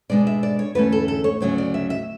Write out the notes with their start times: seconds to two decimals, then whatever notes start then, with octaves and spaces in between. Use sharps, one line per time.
0.09 B2 G#3 D4 D5
0.27 E5
0.43 D5
0.59 C#5
0.75 E2 D3 A3 C#4 B4
0.92 A4
1.08 A4
1.24 C#5
1.40 D2 C#3 F#3 C#4 C#5
1.58 D5
1.74 E5
1.90 E5